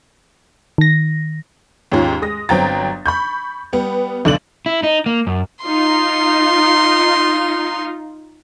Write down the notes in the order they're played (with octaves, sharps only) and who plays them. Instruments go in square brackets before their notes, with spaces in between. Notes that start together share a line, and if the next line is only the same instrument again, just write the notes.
[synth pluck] D#3 A#6
[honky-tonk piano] D#2 G#2 C#4 F4
G#3 D#6 A#6
G1 F#3 C4 G5 A#5 A6
B5 C#6 G6
G3 B3
B1 D3 D5 F#7
[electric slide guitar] E4
D#4
A#3
F#2
[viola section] D#4 F4 [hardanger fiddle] C6